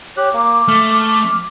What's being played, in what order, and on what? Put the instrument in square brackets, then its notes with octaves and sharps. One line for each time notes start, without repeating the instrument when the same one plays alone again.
[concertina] G4 F#6 [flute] C#5
[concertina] A#3 [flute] D6
[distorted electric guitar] A3 [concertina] F6